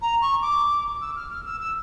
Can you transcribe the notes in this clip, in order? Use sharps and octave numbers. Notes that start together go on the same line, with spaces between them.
A#5
C#6
D6
E6
F6
F6
E6
E6